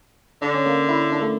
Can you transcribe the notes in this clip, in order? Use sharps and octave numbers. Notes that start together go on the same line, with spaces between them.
D3 D4
C#4
A#3
E4
D4
A3